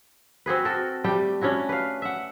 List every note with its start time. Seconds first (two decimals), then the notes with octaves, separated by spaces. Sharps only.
0.46 C4 F#4 G#4 B4
0.65 F#4 A4 A#4
1.04 G3 A3 G5
1.41 C#4 D4 E4 F#4
1.69 B4 F5
2.02 E5 F#5